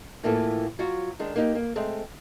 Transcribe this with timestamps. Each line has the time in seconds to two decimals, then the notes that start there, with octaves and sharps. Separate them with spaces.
0.24 A2 E3 A#3 F4 A4
0.79 F#3 F4 F#4
1.19 D#3 G#3 D4
1.36 A#3 D#4 G4
1.55 A#3
1.76 G#3 A3 C4